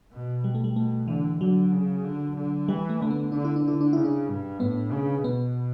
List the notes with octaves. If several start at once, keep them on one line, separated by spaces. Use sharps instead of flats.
B2
G3
A3
G3
B2 A3
D3 E3
D3 F#3
C#3
D3
D3
E3 G3
A3
D3 A3
B3
D3 D4
E4
D4
D3 E4
D4
C#3 E4
D4
G2
A2 B3
C#3
B2 B3